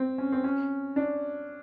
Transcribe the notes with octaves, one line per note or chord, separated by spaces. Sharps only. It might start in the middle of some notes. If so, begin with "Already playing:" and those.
Already playing: C4
C#4
C4
C#4
D4